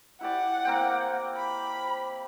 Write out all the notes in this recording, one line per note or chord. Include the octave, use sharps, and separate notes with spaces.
E4 G4 D5 F#5
A#3 C4 G5
B5